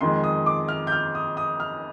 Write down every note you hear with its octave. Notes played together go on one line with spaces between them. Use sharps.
F2 D#3 G#3 C6
D#6
D6
F6
G6
F6
D#6
D#6
F6